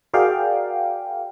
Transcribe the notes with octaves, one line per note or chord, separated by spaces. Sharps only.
F#4 G#4 A#4 D5 F5 G5